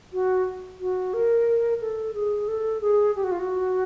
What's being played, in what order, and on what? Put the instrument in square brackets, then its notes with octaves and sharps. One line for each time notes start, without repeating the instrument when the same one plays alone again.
[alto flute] F#4
F#4
A#4
A4
G#4
A4
G#4
G4
F#4
F4
F#4